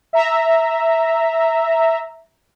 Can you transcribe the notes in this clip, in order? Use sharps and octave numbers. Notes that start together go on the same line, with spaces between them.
E5 A#5